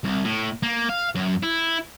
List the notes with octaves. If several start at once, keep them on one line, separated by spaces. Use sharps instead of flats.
C2
A2
A#3
F5
F#2
E4